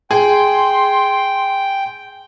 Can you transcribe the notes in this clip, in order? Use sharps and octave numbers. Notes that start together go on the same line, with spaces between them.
G#4 G5 C6